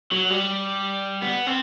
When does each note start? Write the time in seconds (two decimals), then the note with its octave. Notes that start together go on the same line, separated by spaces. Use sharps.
0.11 F#3
0.30 G3
1.22 B3
1.47 C4